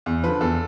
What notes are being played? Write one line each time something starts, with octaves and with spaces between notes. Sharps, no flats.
E2
D3 F3 B4
E2 A4